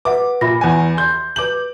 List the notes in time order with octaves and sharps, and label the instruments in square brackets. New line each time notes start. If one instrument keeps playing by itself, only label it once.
[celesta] B4 E5 F#5 [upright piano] D6
[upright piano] A#2 [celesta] E5 B5 A#6
[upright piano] E2 G#5
C6 G6
[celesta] B4 G6 [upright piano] D6 F#7